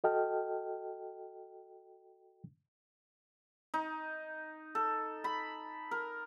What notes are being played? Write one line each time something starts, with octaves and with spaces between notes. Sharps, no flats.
F#4 A4 D#5 G5 A5 F6
D#4
A4
B5
A#4